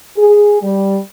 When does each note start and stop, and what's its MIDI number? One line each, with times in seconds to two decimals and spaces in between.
0.17 0.60 68
0.62 0.97 55